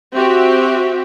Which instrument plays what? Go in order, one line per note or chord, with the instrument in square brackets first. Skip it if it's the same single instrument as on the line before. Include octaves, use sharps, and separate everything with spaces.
[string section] C4 F#4 G4 E5